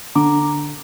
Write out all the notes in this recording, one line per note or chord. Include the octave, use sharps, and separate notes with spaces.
D3 A#5 D6